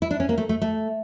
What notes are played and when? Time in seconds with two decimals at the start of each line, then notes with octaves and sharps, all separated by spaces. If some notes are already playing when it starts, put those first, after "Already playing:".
0.02 E4
0.11 D4
0.20 C#4
0.29 A#3
0.38 A3
0.49 A3
0.62 A3